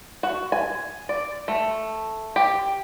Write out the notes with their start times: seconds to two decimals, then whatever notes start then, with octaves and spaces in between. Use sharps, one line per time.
0.23 F#4
0.52 G#5
1.09 D5
1.48 A3
2.36 G4